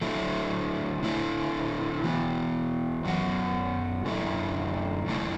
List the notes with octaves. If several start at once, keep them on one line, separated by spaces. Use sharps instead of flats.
D3 F#3 A3 E4
D3 A3 E4
E3 B3 F#4
F#2 F#3 B3 F#4
F#2 D3 A3 E4
F#2 D3 A3 E4